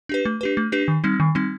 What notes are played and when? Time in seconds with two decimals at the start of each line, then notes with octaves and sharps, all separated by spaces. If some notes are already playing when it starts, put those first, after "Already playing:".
0.09 D4 G4 B4
0.25 A3
0.41 D4 G4 B4
0.57 A3
0.72 D4 G4 B4
0.88 D#3
1.04 G3 C4 D#4
1.20 D#3
1.35 G3 C4 D#4